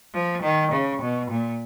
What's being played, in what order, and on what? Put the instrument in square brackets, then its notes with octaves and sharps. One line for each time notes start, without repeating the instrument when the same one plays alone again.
[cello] F3
D#3
C#3
B2
A#2